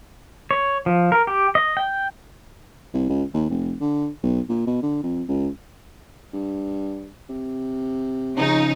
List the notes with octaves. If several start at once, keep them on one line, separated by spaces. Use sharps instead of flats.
C#5
F3
A#4
G4
D#5
G5
C2
C#2
D#2
F1
D3
B1
A#2
B2
D3
F2
C#2
G2
C3
C#3 F3 D#4